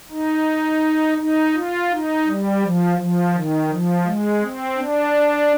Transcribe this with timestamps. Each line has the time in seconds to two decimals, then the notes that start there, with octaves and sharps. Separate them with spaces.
0.10 D#4
1.18 D#4
1.54 F4
1.91 D#4
2.25 G3
2.62 F3
2.98 F3
3.33 D#3
3.70 F3
4.06 G#3
4.42 C4
4.77 D4